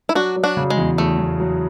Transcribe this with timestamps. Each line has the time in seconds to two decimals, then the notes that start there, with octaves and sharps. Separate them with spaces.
0.09 E4
0.15 F#3 D4 F#4
0.36 F#3
0.44 D4 F#4
0.57 C#3
0.70 G#3
0.77 E2
0.98 E2 A3
1.19 E2
1.40 F#3